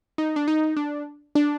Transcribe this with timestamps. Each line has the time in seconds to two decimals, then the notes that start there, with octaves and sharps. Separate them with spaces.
0.18 D#4
0.36 D4
0.48 D#4
0.77 D4
1.35 D4